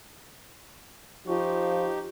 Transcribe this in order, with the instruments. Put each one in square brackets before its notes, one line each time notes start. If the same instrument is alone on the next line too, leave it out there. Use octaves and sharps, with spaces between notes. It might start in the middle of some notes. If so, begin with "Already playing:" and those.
[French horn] F3 [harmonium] D#4 G4 [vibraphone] F4 C#6